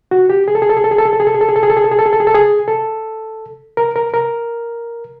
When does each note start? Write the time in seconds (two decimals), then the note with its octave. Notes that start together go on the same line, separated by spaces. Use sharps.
0.11 F#4
0.30 G4
0.48 G#4
0.55 A4
0.62 G#4
0.70 A4
0.77 G#4
0.84 A4
0.91 G#4
0.99 A4
1.06 G#4
1.13 A4
1.20 G#4
1.27 A4
1.34 G#4
1.41 A4
1.49 G#4
1.56 A4
1.63 G#4
1.70 A4
1.77 G#4
1.84 A4
1.91 G#4
1.99 A4
2.06 G#4
2.13 A4
2.20 G#4
2.27 A4
2.34 G#4
2.68 A4
3.77 A#4
3.96 A#4
4.14 A#4